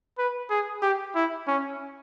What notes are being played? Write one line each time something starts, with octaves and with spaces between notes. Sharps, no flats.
B4
G#4
G4
E4
C#4